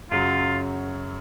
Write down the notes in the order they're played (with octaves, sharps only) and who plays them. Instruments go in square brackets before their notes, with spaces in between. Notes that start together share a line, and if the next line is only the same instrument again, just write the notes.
[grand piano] F#2 C#3 F#3 [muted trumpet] F4